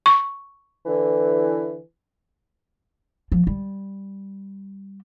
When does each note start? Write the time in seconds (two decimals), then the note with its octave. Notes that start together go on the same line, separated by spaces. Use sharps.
0.06 C#6
0.86 D3 E3
3.32 F3
3.47 G3